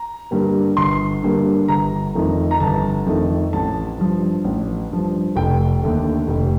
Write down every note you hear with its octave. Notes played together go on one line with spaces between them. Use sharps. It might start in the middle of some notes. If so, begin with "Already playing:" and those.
Already playing: A#5
G2 D3 G3 A#3
G1 C6
G2 D3 G3 A#3
G1 A#5
F2 D#3 A3
A#5
G1 A5
F2 D#3 A3
A1 A5
G2 F3
A1
G2 F3
F1 G5
D#2 D3 A3
F1